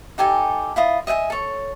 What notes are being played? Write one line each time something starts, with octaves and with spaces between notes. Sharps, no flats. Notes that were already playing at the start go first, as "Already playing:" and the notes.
D#4 G4 A4 G#5
E4 F4 D#5
D#5 E5 G5 G#5
A4 C#5